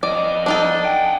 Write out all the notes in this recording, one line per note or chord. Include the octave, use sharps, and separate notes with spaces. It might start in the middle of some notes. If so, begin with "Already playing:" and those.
F2 D5 D#5
D4 D#4 A4
F#5 G5